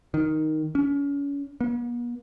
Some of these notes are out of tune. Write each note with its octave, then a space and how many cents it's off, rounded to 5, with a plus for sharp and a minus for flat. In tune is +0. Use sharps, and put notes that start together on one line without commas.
D#3 +0
C#4 +35
B3 -45